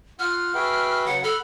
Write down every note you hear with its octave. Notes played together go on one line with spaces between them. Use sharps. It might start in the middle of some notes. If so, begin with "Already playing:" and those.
F4 F#5 F6
F#4 G#4 B4 E5 G5
C#3 F#3 F#5
A4 F#5 B5 F6